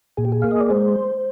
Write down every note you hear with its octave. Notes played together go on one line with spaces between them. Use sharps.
A#2 G#4
G4
G#4
A#3 F5
D#5
D5
G#3 C5